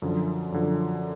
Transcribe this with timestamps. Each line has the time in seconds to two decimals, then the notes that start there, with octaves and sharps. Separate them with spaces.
0.02 F#2 D3 F3
0.52 F#2 D3 F3